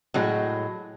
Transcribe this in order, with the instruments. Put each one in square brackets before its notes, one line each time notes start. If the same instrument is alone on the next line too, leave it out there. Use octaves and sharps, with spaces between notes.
[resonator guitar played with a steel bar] A2 F#3 G#3